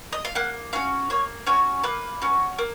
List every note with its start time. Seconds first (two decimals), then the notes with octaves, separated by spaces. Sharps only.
0.13 D#5
0.25 F5
0.35 A#3 F#5
0.73 C#4 F#4 F5
1.10 A#3 C#5
1.47 C#4 F#4 C#5
1.83 A#3 B4
2.22 C#4 F#4
2.59 A#3